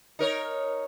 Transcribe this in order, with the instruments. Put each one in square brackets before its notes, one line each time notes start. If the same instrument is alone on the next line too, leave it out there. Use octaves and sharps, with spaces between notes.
[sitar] D#4 A#4 C#5